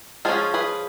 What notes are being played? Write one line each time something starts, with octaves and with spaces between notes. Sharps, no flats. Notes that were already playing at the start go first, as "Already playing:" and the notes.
F3 G#3 C#4 F4 G#4
G#4 B4